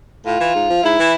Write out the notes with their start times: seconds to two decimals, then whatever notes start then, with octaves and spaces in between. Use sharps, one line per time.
0.25 A2 F4
0.39 E3
0.53 G#2
0.68 F3
0.82 G#2 E4
0.97 E3